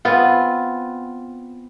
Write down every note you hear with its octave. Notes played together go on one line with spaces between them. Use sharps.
B3 C4 F4 B4